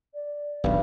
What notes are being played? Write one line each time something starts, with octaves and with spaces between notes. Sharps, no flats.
D5
D#1 B1 G2